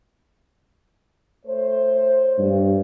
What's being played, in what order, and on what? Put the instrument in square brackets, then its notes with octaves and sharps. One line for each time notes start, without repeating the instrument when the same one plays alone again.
[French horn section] A3 C5 C#5
[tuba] G2